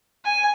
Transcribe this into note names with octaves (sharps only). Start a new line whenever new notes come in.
G#5